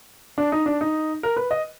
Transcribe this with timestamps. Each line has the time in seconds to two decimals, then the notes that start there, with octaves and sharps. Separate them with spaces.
0.38 D4
0.52 D#4
0.66 D4
0.81 D#4
1.23 A#4
1.37 B4
1.51 D#5